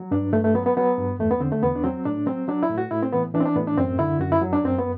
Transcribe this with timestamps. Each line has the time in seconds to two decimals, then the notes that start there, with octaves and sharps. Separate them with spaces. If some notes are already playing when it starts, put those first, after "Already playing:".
Already playing: F#3
0.11 G2 D4
0.33 G2 A3
0.44 A3
0.54 F#3 B3
0.66 B3
0.77 F#3 B3
0.98 G2
1.19 E2 A3
1.31 B3
1.40 D3 C4
1.52 A3
1.63 E2 B3
1.76 D4
1.84 F#3 C4
2.05 A2 D4
2.26 F#3 C4
2.48 F#3 D4
2.63 E4
2.69 A2
2.78 F#4
2.91 A2 E4
3.03 C4
3.13 E3 B3
3.34 E3 D4
3.40 C4
3.46 D4
3.56 A2 B3
3.67 D4
3.77 F#2 C4
3.99 D3 E4
4.20 F#2 F#4
4.32 E4
4.42 F#3
4.53 D4
4.63 F#2 C4
4.78 B3